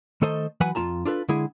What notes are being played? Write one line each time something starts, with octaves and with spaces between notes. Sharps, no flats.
D#3 A3 A4 C5 D#5
E3 F#3 B4 F#5 G#5 B5
F2 F4 A5 A#5
D4 F4 A4 B4
D3 G#3 E4 G#4